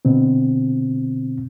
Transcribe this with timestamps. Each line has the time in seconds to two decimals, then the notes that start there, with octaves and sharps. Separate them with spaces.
0.05 B2 D3 C4